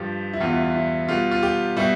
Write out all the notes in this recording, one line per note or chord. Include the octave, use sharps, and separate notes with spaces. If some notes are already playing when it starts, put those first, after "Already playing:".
Already playing: G2 F3 G4
E4
E2 B2 G3 F4
E4
E4
E4
B2 G3 F4
F4
G4
B2 G3 E4